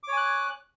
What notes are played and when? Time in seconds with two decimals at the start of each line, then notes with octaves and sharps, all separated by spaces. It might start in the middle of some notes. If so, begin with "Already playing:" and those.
0.03 D6
0.08 C#5
0.13 G#5
0.17 F#6